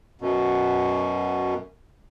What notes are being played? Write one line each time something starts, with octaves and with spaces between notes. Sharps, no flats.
F#2 B2